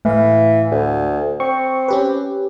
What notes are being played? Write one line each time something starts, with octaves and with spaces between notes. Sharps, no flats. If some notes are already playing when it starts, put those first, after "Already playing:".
A2 E3 F5
D2
C4 C#6
C#4 G4 B4